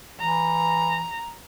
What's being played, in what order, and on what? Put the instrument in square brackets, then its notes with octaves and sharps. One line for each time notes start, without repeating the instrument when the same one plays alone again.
[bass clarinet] E3 [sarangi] A#5